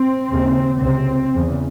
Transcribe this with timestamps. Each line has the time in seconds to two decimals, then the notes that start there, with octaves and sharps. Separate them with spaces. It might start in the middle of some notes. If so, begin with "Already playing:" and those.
Already playing: C4
0.30 D#2 C#3
0.81 C#2 C3 C4
1.34 E2 C#3